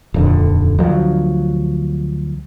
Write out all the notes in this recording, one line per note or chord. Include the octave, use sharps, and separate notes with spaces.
D#1 F2 D3
D2 F3 F#3